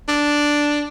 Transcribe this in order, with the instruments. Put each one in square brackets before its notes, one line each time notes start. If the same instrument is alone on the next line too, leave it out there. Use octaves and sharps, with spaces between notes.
[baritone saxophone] D4